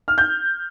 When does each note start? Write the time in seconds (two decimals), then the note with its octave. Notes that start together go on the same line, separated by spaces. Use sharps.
0.08 F6
0.18 G6